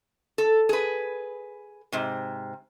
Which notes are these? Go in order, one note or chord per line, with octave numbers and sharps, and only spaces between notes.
A4
G#4 B4
G#2 C3